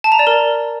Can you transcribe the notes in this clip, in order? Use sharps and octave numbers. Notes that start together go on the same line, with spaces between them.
A5
A#5
D5
A#4